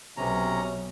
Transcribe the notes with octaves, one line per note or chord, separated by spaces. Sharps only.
B1 C3 C#4 A#5